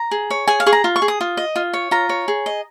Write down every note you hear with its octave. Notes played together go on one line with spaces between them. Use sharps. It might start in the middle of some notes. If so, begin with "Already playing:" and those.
Already playing: A#5
G#4
C#5
G#4 G#5
F5
G#4 C#6
A#5
F4
C#6
G#4
D#6
F4
D#5
F4
C#5
F4 A#5
C#5
G#4
D#5